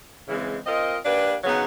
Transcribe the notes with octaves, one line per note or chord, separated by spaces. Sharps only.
C#3 E3 G#3 C4
C4 F4 A#4 D#5
A#3 D4 G4 B4
C#3 F#3 B3 D#4 G#4